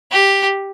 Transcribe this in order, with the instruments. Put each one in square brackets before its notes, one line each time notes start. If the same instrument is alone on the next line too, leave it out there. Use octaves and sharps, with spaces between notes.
[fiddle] G4